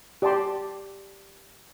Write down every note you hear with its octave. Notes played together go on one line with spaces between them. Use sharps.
G4 D5 A5 C6